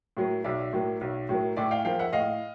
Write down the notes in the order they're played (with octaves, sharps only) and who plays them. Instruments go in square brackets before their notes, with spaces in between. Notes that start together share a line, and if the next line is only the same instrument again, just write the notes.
[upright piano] A2 F#3 A#3
B1 D5 E5
A2 F#3 A#3
B1
A2 F#3 A#3
A2 D5 E5
F5 G5
F3 A#3 F5 G5
E5 F#5
A2 D#5 F5